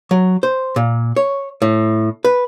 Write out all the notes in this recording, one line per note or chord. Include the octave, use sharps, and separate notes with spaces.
F#3
C5
A#2
C#5
A2
B4